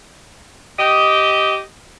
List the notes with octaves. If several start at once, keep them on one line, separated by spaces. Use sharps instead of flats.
G4 D#5